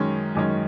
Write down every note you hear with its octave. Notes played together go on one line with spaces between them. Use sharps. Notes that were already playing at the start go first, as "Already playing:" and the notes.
Already playing: F#2 D#3 G#3 C#4
F#2 D#3 G#3 C#4